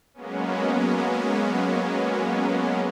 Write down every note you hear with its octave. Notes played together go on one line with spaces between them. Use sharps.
F#3 G#3 A#3 B3 C#4